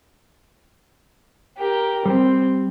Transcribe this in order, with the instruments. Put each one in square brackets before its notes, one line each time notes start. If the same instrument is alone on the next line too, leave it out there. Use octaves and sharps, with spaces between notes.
[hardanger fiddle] G4 A#4
[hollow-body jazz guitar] G3 [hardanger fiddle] C4